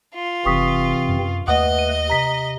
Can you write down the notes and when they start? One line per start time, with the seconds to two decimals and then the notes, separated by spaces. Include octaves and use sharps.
0.13 F4
0.46 F1 C3 E3 C4 C#6 D#6 B6
1.09 F#2
1.48 D#2 A3 B4 D#5 F#5 D#6
1.79 D#7
2.10 C3 A#5 B6